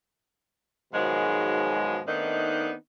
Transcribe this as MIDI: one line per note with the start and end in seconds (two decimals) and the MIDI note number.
0.93 1.99 44
0.93 1.99 47
0.93 1.99 51
0.93 1.99 53
0.93 1.99 54
0.93 1.99 56
2.07 2.73 51
2.07 2.73 57
2.07 2.73 59
2.07 2.73 60
2.07 2.73 62
2.07 2.73 63